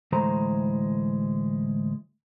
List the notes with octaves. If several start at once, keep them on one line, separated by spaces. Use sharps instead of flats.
D2 A2 E3 G#3 C5 A#5